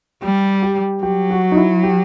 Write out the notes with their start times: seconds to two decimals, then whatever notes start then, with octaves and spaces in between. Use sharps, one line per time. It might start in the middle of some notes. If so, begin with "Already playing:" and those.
0.22 G3 G4
0.63 G4
1.03 F#3 G4
1.30 F#4
1.52 D#4
1.57 E4
1.83 G4